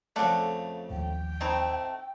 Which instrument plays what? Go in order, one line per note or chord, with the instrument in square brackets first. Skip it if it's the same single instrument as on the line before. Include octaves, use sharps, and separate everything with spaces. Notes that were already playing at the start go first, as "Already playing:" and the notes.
[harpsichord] F2 C#3 A3 [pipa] A4 D5 F#5
[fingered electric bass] A1 D#2 F3 [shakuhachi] G5
[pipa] A3 D#4 E4 [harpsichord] C4 A5